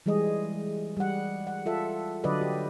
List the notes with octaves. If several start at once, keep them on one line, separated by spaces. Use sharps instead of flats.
E3 G3 G#3 G#4 D#5
G3 F#5
F#5
F4 A4 E5
D3 F#3 B4 D5 D#5
G4